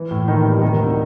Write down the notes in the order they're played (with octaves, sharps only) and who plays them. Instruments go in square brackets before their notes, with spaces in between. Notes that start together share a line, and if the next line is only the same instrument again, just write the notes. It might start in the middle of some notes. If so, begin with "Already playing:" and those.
Already playing: [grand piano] E3
A2
A2 D#3 D#4
G3
C3 D#3 D#4
D2